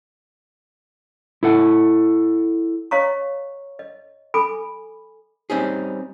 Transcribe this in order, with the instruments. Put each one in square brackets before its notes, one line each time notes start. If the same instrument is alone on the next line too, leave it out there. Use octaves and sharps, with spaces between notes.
[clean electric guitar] E4 A4 F#5
[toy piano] C#5 D#5 F5 A#5 C#6
D#5
A4 G#5 B5 D6
[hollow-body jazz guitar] G3 C4 C#4 D#4 G#4